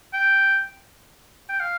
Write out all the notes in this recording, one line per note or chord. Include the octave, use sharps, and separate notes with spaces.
G5
G5
F5